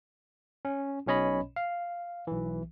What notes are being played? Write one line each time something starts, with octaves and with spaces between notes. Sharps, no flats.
C#4
B1 B2 C#4 C#5 D#5 B5
F5
B1 E3